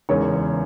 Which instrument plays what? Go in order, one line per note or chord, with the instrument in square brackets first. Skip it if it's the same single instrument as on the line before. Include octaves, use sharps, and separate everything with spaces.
[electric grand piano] E2 C#3 G#3 D#4 A#4 [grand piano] C#5